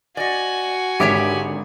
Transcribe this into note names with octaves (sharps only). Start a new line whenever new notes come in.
F#4 D5 D#5 G#5
G#1 D3 G4 C#5 E5 D7